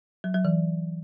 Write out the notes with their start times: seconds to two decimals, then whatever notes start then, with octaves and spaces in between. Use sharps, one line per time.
0.24 F#3
0.34 F#3
0.45 E3